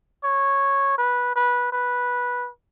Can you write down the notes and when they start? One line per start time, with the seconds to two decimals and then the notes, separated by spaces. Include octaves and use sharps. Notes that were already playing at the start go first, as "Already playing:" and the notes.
0.24 C#5
0.98 B4
1.36 B4
1.72 B4